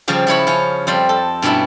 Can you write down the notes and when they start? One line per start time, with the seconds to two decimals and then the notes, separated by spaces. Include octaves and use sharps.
0.08 C#3 F3 G3
0.27 F3 E4 C#5 B5
0.47 F3 C#4
0.87 F2 G3 C5
1.09 A4
1.42 G2 B2 C#4 E4 E5